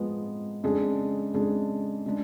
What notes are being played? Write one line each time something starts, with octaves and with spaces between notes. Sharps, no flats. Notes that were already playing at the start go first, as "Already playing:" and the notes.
Already playing: F3 G#3 B3
F2 C#3 G#3 D4 G#4
F2 C#3 G#3 D4 G#4
C#3 G#3 D4